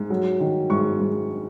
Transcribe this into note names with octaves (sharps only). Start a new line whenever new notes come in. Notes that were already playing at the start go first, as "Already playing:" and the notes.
Already playing: G#2
F#3
D#3
G#2 C#6
G#2